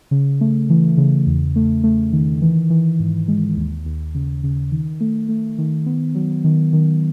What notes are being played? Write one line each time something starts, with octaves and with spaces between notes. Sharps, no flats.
C#3
A3
E3
C#3
E2
A3
A3
D#3
E3
E3
G#2
G#3
D#2
D#2
C#3
C#3
D#3
A3
A3
D#3
B3
F#3
D#3
D#3